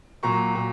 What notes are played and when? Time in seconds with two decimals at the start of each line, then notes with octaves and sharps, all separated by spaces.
0.23 A#2 F#3 A#5 C#6
0.55 A#2